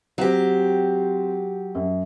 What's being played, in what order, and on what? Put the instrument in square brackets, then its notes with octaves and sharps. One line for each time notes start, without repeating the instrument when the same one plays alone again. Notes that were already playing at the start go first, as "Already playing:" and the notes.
[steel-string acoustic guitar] F#3 G4 [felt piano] C4 C5
[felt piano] F#2